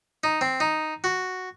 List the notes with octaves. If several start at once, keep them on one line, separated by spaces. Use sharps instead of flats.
D#4
C4
D#4
F#4